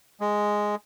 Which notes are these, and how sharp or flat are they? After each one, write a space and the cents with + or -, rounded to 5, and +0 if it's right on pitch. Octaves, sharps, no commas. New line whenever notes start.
G#3 +0